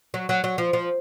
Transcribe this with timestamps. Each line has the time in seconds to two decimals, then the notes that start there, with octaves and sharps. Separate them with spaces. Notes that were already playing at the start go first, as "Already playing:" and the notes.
0.14 F#3
0.29 F#3
0.44 F#3
0.58 F3
0.73 F3